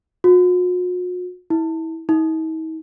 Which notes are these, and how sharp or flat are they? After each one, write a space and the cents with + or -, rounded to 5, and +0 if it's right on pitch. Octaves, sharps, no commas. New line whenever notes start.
F#4 -45
E4 -30
D#4 +45